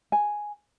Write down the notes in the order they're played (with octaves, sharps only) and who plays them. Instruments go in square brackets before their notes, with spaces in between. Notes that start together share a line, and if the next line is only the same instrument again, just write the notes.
[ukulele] G#5